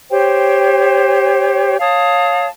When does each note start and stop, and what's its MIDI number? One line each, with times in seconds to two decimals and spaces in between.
0.10 1.76 67
0.10 1.76 72
0.10 1.76 73
0.10 1.76 79
1.80 2.47 73
1.80 2.47 77
1.80 2.47 81
1.80 2.47 87